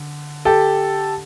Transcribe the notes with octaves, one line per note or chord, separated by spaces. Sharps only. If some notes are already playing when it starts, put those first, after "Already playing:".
Already playing: D3
G4 A4